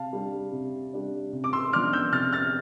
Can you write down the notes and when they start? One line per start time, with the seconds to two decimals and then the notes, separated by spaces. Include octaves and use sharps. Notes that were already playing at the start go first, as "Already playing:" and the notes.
Already playing: C3 F5 A5
0.13 G3 D4
0.52 C3
0.93 G3 D4
1.33 C3
1.44 D6
1.53 C6 E6
1.73 F3 B3 D4 D6 F6
1.93 E6 G6
2.12 C3 F6 A6
2.33 F6 A6